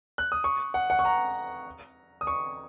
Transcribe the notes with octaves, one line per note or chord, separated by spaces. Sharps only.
F#6
D#6
C#6
F#5
F#5
C#6
A#5
D#6
C#6